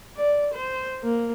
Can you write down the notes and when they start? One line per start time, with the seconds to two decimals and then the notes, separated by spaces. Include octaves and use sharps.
0.16 D5
0.54 C5
1.03 A#3